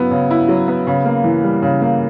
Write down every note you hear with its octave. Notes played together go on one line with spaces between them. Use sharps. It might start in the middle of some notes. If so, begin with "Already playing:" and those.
Already playing: C#3 F#3 B3 E4
C#3
E4
F#3
B3
C#3
A#3
E3
G3
C#3
A#3